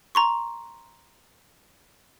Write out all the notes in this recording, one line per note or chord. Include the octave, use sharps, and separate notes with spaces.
A#5 C6 C#6